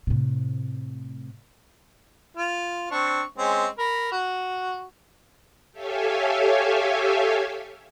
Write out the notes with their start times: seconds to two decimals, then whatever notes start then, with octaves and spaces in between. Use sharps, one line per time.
0.07 A2 C3
2.37 F4
2.91 C4 D4 C#6
3.38 G#3 C4 C#4
3.78 A#4 B5
4.12 F#4
5.72 G4 A4 C#5 E5 F5 G#5